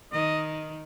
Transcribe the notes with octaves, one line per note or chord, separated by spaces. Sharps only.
D#3 D#5